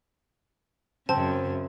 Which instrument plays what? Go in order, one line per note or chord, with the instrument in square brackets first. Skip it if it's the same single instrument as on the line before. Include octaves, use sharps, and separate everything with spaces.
[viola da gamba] F#2 C#3 [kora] C4 [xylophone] A5